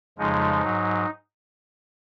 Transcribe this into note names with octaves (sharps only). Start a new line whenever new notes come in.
F2 C#3 F3 G#3 D#4
G#2 F#3